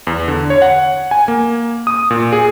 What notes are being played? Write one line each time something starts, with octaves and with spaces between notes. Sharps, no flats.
E2
D3
C#5
F#5
G#5
A#3
D#6
A#2
G#4